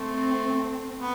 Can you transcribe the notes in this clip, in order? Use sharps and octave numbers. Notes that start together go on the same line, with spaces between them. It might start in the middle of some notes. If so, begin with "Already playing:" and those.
Already playing: A3 C4
B3